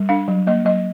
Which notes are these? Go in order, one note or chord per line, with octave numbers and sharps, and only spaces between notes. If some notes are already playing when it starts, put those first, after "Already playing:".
Already playing: G3
D4 F5
F#3
A#3 D#5
F#3 D#5